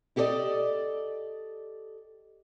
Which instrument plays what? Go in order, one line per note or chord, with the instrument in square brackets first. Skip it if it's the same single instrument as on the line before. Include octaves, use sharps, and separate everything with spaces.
[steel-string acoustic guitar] E4 G4 A4 B4 D5 D#5